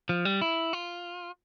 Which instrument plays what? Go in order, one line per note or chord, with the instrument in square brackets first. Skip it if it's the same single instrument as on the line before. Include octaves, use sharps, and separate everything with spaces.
[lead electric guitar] F3
G3
E4
F4